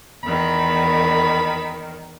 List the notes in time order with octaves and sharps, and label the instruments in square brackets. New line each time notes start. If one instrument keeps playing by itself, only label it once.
[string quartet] E2 D#3 [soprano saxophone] B5